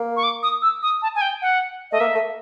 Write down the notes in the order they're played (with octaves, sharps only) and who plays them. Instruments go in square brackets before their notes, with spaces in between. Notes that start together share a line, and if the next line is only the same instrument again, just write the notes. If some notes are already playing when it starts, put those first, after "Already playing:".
Already playing: [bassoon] A#3
[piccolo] C#6
D6
D#6
E6
D#6
A5
G#5
G5
F#5
[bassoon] A3 [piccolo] D#5
[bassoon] A#3 [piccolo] E5
[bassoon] A3